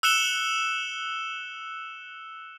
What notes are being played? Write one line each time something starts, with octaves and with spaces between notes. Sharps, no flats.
E6 F#6 C#7 E7 G7